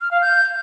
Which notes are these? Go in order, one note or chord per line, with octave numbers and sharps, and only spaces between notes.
F6
F5
G6